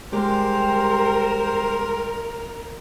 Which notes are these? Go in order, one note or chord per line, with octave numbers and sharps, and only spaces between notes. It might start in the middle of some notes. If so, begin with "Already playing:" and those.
G3 G#3 G4 A#4 C5